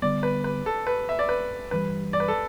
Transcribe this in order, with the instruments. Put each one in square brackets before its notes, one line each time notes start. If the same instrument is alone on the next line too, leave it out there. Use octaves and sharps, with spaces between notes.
[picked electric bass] D3 G3 B3 [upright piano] D5
[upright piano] B4
B4
A4
B4
E5
D5
B4
[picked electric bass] G2 E3 G3 [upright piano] B4
[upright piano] D5
B4
A4